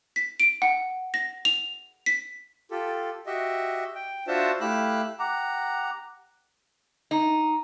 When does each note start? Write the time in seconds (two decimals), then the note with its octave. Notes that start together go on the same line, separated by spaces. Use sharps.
0.16 B6
0.40 D7
0.62 F#5
1.14 A#6
1.45 F7
2.06 B6
2.71 F4 G4 A4
3.26 F#4 G4 D#5 E5
3.95 G5
4.27 D4 F4 F#4 C5 E5 A5
4.61 A3 E4 G4 F5 E6 F#6
5.19 G4 F#5 A#5
7.11 D#4